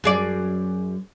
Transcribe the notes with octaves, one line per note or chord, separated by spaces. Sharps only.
F#2 G#4 D5